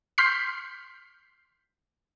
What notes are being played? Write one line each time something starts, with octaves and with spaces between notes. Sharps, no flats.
C6 F6 G6 B6 C7